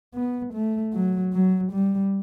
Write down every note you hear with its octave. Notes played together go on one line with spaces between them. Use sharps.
B3
A3
F#3
F#3
G3